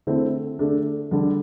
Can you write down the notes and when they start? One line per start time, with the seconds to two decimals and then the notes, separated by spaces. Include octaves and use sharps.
0.07 D3 A3 C4 E4
0.59 D3 A3 D4
1.11 D3 G3 D4